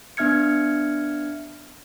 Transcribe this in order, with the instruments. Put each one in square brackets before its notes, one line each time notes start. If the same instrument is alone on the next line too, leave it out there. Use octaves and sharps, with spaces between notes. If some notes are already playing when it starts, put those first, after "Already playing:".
[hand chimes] B3 D4 E5 F6 G#6 C#7